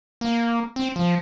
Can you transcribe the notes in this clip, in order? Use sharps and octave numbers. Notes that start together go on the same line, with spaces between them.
A#3
C4
F3